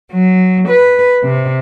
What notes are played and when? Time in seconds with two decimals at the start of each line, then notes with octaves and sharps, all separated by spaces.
0.12 F#3
0.69 B4
1.23 C3